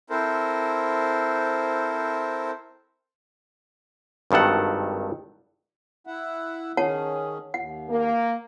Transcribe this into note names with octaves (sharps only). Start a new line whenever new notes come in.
C4 E4 A4 A#4 C5
G#1 G2 D#3 A4 F#5
E4 E5 F#5
D#3 C#4 G#4 C#5 F#5 A5
D#2 F#5
A#3